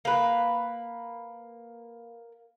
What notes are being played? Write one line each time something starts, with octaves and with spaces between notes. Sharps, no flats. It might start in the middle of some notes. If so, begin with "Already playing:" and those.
A#3 B4